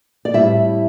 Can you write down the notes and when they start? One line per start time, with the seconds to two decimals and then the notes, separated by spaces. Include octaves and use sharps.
0.25 D5
0.34 A2 G3 C4 E4 E5